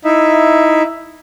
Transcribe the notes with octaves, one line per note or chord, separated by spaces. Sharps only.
D#4 E4 E5